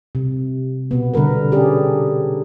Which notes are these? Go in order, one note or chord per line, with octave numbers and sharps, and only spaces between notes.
C3
B2 B3
D3 G3 A#4 B4
C#4 D4 G4 G#4 D5